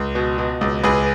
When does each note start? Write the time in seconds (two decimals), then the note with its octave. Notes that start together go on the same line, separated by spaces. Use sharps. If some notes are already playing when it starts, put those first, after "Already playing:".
Already playing: C#2
0.15 B2
0.38 B2
0.61 C#2
0.83 C#2 G#4 B4